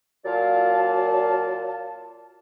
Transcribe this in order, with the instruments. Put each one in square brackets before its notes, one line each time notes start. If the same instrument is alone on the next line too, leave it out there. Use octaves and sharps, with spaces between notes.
[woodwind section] A#2 F#3 F4 D5 F5 A5